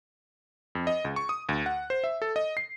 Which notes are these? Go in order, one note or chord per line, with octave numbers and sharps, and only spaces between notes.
F2
D#5
C#2
C#6
D#6
D2
F#5
C5
E5
A4
D#5
C7